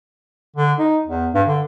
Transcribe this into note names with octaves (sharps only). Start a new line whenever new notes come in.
D3
D#4
E2
G2
D3